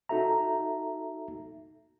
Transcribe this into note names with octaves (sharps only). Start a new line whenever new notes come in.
D#4 F#4 A4 E5 A#5